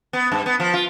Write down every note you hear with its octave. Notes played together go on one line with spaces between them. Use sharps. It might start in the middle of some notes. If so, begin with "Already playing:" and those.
B3
G2
B3
F3
F4